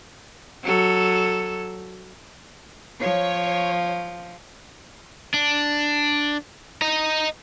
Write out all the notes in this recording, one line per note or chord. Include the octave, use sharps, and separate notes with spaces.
F#3 A4
F3 C#5
D4
D#5 A#5